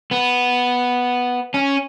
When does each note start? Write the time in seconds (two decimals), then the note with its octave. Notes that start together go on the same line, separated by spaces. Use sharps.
0.11 B3
1.54 C#4